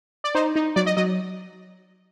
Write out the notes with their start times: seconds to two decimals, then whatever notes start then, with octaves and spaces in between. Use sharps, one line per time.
0.24 D5
0.35 D#4 C5
0.56 D#4
0.76 F#3 D5
0.86 D#5
0.97 F#3 D#5